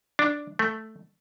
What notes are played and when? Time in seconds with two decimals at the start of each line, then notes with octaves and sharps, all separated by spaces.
0.19 D4
0.59 A3